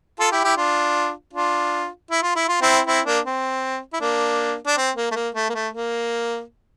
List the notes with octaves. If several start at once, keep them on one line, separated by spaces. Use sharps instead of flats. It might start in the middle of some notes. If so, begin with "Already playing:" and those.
F4 A4
E4 G4
E4 G4
D4 F4
D4 F4
E4
F4
E4
F4
C4 E4
C4 E4
A#3 D4
C4
E4
A#3 D4
D4
C4
A#3
A3
A#3
A3
A#3
A3
A#3